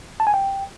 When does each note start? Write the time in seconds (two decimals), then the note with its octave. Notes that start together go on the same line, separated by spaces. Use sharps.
0.20 A5
0.27 G#5
0.34 G5